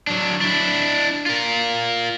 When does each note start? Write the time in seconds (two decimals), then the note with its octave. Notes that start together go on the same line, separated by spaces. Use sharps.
0.07 F#3 D4
0.41 D4 E4
1.26 F4 A#4